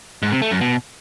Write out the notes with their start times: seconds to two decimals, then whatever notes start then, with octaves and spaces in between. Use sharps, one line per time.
0.22 G#2
0.32 C3
0.42 A3
0.51 F#2
0.61 B2